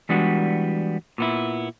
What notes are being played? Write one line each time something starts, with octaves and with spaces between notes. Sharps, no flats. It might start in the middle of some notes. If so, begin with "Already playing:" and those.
E3 G3 G#3 B3 D4 F#4
A#2 B3 E4